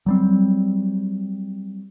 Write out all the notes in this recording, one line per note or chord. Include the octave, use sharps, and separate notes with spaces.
F#3 G3 C4